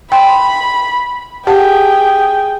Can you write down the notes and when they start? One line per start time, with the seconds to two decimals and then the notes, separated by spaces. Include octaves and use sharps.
0.12 G5 B5 C6
1.47 G4 G#4 F#5 G5 A5